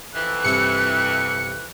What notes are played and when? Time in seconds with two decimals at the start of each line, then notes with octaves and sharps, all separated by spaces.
0.14 F2 E3 F#6
0.45 G2 C3 E4 C#7